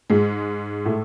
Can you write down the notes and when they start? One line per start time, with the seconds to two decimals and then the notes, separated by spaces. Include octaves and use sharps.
0.10 G#2 G#3
0.85 A2 A3